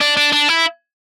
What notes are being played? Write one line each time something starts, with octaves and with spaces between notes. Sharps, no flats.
D4
D4
D4
E4